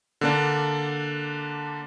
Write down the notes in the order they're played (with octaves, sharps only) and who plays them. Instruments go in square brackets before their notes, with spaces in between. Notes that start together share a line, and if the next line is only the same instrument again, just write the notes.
[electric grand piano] D3 A#3 D4